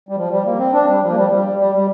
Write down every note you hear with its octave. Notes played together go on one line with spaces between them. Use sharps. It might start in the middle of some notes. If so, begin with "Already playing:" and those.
G3
F3
G3
A#3
C4
D4
G3
F3
A#3
G3
G3
G3
G3